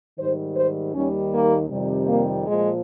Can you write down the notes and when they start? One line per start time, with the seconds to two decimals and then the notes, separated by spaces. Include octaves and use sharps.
0.18 G#2 D#3 G3 C5
0.56 C5
0.94 D#2 D#3 G3 C#4
1.32 A#3
1.70 F2 C3 D#3 G3
2.08 A#3
2.46 A#2 F3 G#3